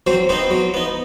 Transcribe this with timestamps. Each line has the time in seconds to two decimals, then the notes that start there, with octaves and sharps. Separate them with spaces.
0.07 F#3 C4 C5
0.29 B3 C4 D#4 C5
0.51 F#3
0.74 B3 D#4